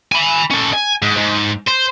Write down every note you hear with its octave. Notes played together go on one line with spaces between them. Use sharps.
G#5 B5
C#4 A4
G#5
G#2
G#2
C5